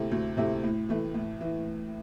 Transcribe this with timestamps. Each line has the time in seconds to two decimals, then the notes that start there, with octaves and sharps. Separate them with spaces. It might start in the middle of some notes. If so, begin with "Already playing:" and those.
Already playing: D2 C3 A3 E4
0.11 D2
0.37 C3 A3 E4
0.63 A2
0.89 E3 A3
1.14 A2
1.41 E3